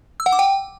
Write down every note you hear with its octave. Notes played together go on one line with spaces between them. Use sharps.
E6
F#5
D6
G5